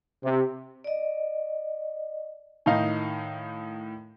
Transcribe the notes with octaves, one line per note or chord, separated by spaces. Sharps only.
C3
D5 D#5
A2 D#3 D#4 F5